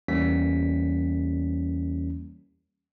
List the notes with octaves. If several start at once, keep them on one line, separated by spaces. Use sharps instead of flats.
E2 E3 G3 A#3 C#4 B6